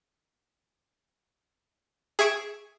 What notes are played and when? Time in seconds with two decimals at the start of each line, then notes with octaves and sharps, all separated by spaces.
2.19 G#4 E5 G#5 C#6 D7 E7